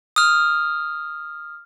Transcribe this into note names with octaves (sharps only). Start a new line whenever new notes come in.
D#6 F6